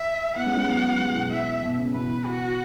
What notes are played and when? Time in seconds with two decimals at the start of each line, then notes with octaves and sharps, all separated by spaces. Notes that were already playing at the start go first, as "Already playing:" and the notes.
Already playing: E5
0.35 B3 E4 F#5
0.46 G#3 C#4
0.57 G#3 C#4
0.67 F#3 B3
0.99 E3 G#3
1.15 B2 E3
1.31 E5
1.63 B2
1.78 C#3
1.94 B2 E3 B4
2.26 F#4